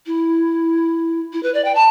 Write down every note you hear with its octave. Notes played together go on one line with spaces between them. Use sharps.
E4
E4
B4
D5
G5
A5